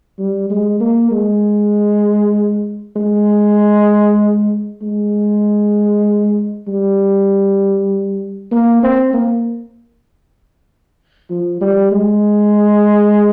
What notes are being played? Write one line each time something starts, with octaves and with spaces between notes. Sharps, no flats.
G3
G#3
A#3
G#3
G#3
G#3
G3
A#3
C4
A#3
F3
G3
G#3